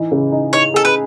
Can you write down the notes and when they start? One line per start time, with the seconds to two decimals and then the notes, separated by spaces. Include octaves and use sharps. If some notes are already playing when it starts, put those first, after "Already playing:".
Already playing: E3 D#4
0.11 C#3
0.32 D#4
0.53 D#4 C#5
0.74 G#4 A4
0.85 B4